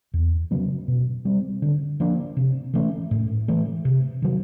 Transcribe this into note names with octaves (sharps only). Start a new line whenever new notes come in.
E2
C#3 F#3 B3
B2
G3 C4
D3
F3 A#3 D4
C3
E3 A3 C#4
A2
E3 A3
C3
D#3 F#3